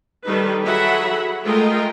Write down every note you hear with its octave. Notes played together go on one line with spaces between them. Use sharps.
D#3 G3 D#4 A4 B4
F#3 G#4 A4 E5 F#5 B5
G#3 A3 F4 A#4 D#5 G5